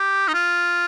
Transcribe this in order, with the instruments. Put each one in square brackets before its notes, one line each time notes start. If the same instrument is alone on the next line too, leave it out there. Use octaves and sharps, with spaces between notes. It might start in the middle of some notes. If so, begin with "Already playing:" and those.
Already playing: [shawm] G4
D#4
F4